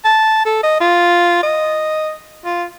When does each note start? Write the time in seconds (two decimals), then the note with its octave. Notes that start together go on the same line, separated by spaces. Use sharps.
0.05 A5
0.46 A4
0.63 D#5
0.80 F4
1.43 D#5
2.45 F4